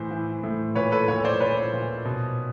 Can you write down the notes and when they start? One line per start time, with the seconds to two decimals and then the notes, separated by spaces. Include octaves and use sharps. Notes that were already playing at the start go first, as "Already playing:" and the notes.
Already playing: A2 E3 C5
0.11 E3
0.43 A2
0.75 A#2 B4 C#5
0.92 A4 B4
1.08 A#2 B4 C#5
1.24 C5 D5
1.40 A#2 B4 C#5
1.73 A#2
2.05 B2